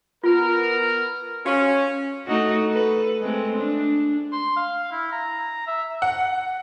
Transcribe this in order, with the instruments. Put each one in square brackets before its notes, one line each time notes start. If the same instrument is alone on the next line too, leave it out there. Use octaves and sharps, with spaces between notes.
[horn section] B3 A#4 [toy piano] F4
[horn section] C#4 [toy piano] F#4 F5
[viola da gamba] A3 D#4 F#4
A4 B4
G#3 A3 C4
D4
[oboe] C6
F5
E4
A#5
E5
[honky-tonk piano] F#5